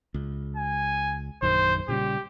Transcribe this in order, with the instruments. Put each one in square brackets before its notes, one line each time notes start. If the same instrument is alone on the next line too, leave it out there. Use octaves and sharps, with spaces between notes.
[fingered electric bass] C#2
[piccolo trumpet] G#5
[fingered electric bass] A#1 F#2 D#3 [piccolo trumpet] C5
[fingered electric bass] A#2 C#3 G3 [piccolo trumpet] G4